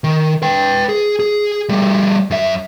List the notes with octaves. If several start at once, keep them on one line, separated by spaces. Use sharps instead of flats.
D#3
B4 G5
G#4
G#4
G3 A3
F#2 E5